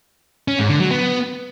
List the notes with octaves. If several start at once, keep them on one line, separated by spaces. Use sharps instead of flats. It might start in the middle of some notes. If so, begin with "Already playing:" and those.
C#4
G#2
D3
F#3
B3